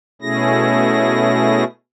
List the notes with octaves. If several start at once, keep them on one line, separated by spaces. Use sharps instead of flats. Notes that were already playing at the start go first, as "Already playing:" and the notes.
B2 A3 C#4 E4 G#4 A#6